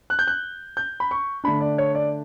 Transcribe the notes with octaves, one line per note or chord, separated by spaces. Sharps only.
F#6
G6
F#6
G6
B5
C#6
D3 A3 D4 B5
D5
C#5
D5